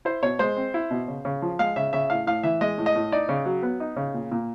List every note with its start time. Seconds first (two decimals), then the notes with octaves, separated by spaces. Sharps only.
0.05 E4 C5
0.23 B2 C#5
0.39 G#3 C5
0.57 C4
0.74 E4
0.91 B2
1.08 C#3
1.25 C#3
1.42 F3
1.59 G#3 F5
1.76 C#3 E5
1.93 C#3 E5
2.10 A2 F5
2.27 A2 F5
2.43 E3 E5
2.61 G#3 D#5
2.78 A2
2.86 D#5
2.95 A2
3.12 D#4 D5
3.29 C#3
3.45 F#3
3.63 B3
3.80 D#4
3.96 C#3
4.14 A#2
4.32 A#2